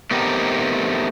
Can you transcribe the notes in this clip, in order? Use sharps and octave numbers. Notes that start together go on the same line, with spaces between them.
A3 B3 C4 D#4 G4 A#4